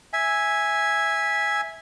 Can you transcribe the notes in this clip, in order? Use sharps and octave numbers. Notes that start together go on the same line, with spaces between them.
E5 G#5